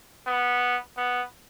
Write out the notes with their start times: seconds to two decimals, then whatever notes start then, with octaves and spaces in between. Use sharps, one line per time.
0.27 B3
0.97 B3